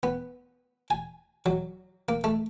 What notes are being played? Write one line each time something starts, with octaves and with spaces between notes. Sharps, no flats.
B3
G#5
F#3
A#3
A3